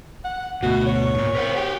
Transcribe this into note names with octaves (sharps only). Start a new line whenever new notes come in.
F#5
D2 G#2 B2 A3 F#4
C#5
F#2 A#2
A#4 C5 F#5 B6
F#4 G4 G5